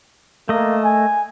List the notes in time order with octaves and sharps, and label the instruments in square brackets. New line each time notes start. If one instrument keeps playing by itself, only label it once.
[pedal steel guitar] A3 D#5 [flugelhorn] A#3
[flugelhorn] G#5